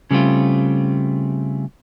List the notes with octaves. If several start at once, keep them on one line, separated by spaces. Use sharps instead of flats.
C#3 G3 A3 C4 F4